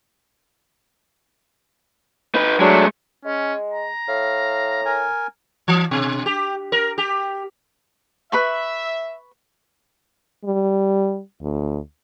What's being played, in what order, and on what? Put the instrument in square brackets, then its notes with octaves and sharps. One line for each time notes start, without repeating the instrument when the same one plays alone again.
[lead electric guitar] D#4 B4
[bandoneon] F#3 D4 [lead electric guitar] G#3 A3
[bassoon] G#3 [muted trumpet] C#4
[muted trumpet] A#5
[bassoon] A2 [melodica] F5
[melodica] A#4 G#5
[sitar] E3
B2
G4
A#4
G4
[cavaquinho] B4 B5 C#6 [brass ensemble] E5
[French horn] G3
D2